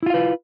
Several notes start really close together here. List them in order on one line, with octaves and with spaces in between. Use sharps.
E4 F4 F5 B4